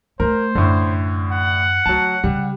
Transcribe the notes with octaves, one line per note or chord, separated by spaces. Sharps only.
A3 A#4 C5
F#2 A2 D3
F#5
D2 F#3 A5
C#3 G3